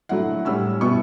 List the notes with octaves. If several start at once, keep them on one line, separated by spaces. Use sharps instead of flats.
D3 F#3 A3 E4 F#5
A2 G3 C#4 E6
B2 G3 B3 E4 C#6